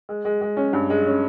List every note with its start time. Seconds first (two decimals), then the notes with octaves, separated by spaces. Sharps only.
0.09 G#3
0.25 G#3
0.41 G#3
0.57 C#4
0.73 G2
0.90 G#3
1.06 C#4